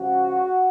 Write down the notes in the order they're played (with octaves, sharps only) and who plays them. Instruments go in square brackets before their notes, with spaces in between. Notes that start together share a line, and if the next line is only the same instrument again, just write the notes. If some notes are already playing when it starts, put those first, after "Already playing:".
Already playing: [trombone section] C#2 C#3 F3 F#4